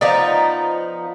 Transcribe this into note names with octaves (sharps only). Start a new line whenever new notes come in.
F3 B3 D#4 D5